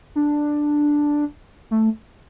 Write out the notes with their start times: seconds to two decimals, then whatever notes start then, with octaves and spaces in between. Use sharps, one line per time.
0.16 D4
1.71 A3